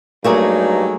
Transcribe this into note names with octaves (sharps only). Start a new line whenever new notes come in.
G2 F#3 G3 A3 A#3 D#4 G#4